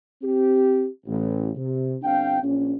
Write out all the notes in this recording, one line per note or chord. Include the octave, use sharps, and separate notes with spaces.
C4 G4
A1
C3
G1 C4 D4 F5 G5
A#1 C#4